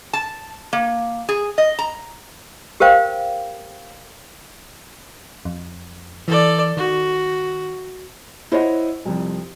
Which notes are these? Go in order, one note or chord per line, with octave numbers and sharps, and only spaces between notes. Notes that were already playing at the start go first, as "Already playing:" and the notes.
A5
A#3
G#4
D#5
A#5
G4 A#4 C5 F5 G5
F2
E3 A4 D5
D#3 F#4
E4 C5 C#5 D#5 F#5
C2 F2